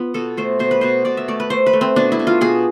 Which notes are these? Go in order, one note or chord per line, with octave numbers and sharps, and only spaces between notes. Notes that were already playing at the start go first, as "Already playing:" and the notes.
Already playing: B3 F4
B2 A4
A3 C5
B2 C5
B4
B2 C5
B2 D5
E5
A3 D5
B4
A3 C5
B4
A3
C4
B2 D4
E4
B2
F4
B2 G#4